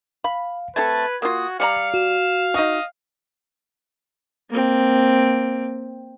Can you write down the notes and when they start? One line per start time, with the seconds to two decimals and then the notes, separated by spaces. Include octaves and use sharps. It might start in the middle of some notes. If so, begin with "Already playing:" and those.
0.24 F5 B5
0.76 A3 C4 A4 B4 G#6 A6
1.22 A#3 F4 F#4 D#6
1.60 G3 D5 F5 A#5 C#7
1.94 F#4 E7
2.54 D#4 F#4 D#5
4.50 A#3 C4